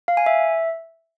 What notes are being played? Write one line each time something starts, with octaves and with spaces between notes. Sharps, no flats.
F5
G#5
E5